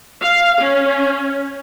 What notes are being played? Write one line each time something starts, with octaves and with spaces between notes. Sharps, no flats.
F5
C#4